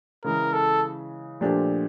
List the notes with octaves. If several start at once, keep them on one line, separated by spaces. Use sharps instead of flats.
C#3 E3 G#3 A#4
A4
A#2 F3 A3 D4 G4